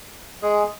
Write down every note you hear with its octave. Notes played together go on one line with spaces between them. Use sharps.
G#3 G#4